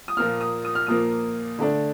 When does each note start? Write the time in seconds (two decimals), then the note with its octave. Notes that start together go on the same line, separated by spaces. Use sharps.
0.08 D#6
0.17 A#2 F3 A#3 F4 F6
0.41 D#6
0.65 D#6
0.75 F6
0.87 A#2 F3 A#3 F4 D#6
1.59 D3 A3 D4